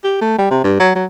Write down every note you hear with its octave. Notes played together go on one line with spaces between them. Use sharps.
G4
A3
G3
C3
G2
F#3
F#3